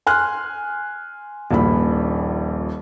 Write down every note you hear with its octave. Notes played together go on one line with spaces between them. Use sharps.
G#5 C6 F6 F#6
D#1 A#1 B5